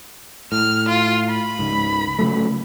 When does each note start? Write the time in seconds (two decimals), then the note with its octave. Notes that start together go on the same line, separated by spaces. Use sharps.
0.52 A2 F6
0.88 F4
1.29 B5
1.59 C#2 G#2
2.19 C#3 F#3 A3